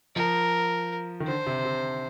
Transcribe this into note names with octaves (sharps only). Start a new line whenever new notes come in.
F3 A#4
D#3
D3 C5
C3
C3